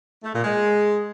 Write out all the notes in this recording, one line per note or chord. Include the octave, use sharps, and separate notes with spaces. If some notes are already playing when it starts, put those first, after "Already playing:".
A3
A#2
G#3